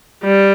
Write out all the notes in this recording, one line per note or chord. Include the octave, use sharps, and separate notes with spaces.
G3